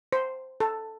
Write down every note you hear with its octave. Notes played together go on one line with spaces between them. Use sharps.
C5
A4